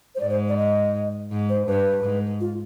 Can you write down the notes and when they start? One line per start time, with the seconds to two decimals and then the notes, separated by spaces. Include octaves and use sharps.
0.15 C5
0.20 G#2 D5
0.30 C5
0.49 D5
0.57 D#5
1.31 G#2
1.49 C5
1.67 G2 B4
2.04 G#2
2.40 F4